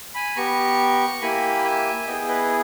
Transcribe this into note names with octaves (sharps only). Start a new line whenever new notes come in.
G#5 B5
B3 G4 A#5 C#6
A#3 E4 G4 G#5 B5
E5 G#5
B3 E4 G#4 D#5 G5
B4 D#5